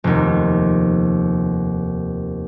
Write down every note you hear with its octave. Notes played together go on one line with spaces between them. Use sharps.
F1 D#2